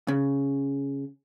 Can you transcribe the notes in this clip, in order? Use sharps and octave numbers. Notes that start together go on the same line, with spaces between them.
C#3